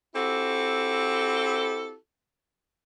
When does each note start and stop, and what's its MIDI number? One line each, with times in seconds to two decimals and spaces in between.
0.15 1.96 60
0.15 1.96 64
0.15 1.96 66
0.15 1.96 67
0.15 1.96 69